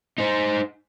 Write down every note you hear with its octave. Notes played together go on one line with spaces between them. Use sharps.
D#4 C5